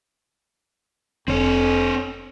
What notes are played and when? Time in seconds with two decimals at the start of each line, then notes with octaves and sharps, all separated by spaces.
1.28 F1 F2 C4 C#5